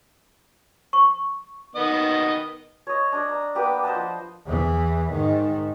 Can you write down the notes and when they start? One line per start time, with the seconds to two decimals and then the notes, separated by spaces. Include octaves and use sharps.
0.93 C#6
1.76 D#3 B3 D#5
2.87 C#5 D#5
3.12 D4 D#5
3.29 A#5
3.55 A#3 B3 G4 B4
3.83 C5 D#5 F#5 A5
3.95 F3
4.47 E2 E3
5.11 G#2 D#3